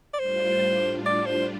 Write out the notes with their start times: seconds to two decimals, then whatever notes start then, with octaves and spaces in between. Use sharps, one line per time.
0.13 D5
0.19 A2 G3 D4 F4 C5
1.06 D5
1.26 C5